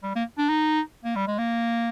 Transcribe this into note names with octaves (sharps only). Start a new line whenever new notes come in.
G3
A#3
D4
D#4
A#3
G3
G#3
A#3